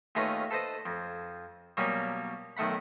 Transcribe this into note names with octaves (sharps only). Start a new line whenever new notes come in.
D#2 A3 C#4 F4 B4 D#5
A4 B4 C5 D#5
F2
B2 F#3 G3 A#3 C#4
B1 D#3 A3 F#5 B5